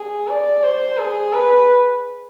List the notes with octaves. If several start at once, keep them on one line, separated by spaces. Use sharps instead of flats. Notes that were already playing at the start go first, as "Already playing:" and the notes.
Already playing: G#4
D5
C5
G#4
B4